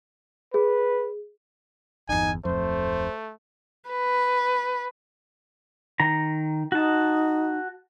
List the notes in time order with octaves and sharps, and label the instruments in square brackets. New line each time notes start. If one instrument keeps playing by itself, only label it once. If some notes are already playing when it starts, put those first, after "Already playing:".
[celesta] G#4 [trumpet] B4
[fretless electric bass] G1 E2 [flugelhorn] D#4 [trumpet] G#5
[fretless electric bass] D1 F2 [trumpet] A3 [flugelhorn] C5
[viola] B4
[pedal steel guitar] D#3 A#5
[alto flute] D#4 [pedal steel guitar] F#4 A5